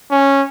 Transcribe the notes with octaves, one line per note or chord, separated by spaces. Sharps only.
C#4